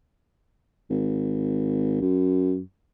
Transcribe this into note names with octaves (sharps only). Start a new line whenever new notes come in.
G#1
F#2